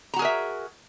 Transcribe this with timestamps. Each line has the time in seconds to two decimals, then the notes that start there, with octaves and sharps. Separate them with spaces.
0.14 A#5
0.16 F#4
0.19 G#4
0.22 A#4
0.25 E5